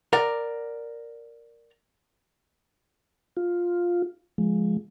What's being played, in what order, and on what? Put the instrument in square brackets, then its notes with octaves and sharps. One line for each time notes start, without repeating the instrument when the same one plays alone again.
[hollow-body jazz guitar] A#4 D5 F#5
[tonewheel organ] F4
F3 G#3